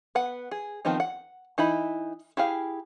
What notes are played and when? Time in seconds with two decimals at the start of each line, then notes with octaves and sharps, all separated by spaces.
0.15 B3 B4 F#5
0.51 G#4
0.85 D#3 F3 B3 C4 D#4
1.00 F#5
1.58 E3 D#4 E4 B5
2.37 E4 G4 G#4 F5